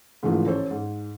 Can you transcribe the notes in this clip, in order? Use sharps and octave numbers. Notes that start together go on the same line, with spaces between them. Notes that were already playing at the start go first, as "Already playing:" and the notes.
G#2 C#3 E3 F3 A3 A#3
A1 A4 C5 C#5
G#2